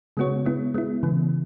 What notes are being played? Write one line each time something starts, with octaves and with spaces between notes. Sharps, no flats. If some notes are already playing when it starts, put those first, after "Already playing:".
C#3 G#3 B3 F#4 C#5
G#3 B3 E4
G#3 B3 E4
C#3 E3 B3